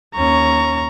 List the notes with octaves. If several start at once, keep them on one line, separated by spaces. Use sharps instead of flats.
D#2 C#4 A#5 C#6